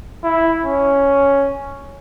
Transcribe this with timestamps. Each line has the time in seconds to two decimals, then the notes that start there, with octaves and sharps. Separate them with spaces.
0.24 E4
0.65 C#4